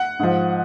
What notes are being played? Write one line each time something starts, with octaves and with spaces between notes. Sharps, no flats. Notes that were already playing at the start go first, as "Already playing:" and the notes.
Already playing: F#5
G#2 F3